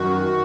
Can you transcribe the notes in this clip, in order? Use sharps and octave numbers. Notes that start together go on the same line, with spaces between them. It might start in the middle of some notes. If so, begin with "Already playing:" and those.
Already playing: F#2 D#3 F#4